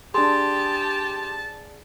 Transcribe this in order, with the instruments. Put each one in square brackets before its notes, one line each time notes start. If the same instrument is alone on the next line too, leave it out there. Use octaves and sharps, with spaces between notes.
[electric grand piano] D4 G#4 [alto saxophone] G4 [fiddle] A5 [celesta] C6